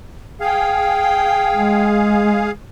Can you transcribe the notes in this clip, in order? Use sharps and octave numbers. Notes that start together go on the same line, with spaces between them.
G#4 F5 G5
G#3